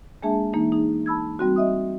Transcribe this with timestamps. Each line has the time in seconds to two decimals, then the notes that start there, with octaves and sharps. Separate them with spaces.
0.23 G#3 A#3 D4 G#4 E5 A5
0.53 E3 A#3 D#4
0.72 D#4 G#4
1.06 A5 B5 E6 G#6
1.39 G3 C4 F#4
1.56 D#5 E5 D#6